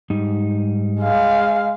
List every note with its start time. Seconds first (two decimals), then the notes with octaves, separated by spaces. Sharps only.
0.10 G#2 G3 D#4
1.01 G#3 F5